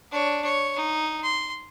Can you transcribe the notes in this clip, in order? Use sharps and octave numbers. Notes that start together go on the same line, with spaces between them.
D4 C#5
C#5
D#4
C6